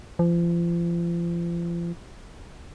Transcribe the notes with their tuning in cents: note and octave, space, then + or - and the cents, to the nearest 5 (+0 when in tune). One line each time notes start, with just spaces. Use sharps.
F3 -35